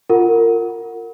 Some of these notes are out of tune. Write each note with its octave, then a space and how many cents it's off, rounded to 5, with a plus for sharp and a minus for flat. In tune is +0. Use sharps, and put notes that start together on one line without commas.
F4 +0 A#4 -25 F#5 -5